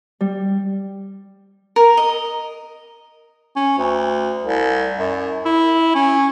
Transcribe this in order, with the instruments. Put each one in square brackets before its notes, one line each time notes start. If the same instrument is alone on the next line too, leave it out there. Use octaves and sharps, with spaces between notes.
[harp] G3
[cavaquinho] A#4
D#5
[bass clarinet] C#4
D2
C2
F#2
E4
C#4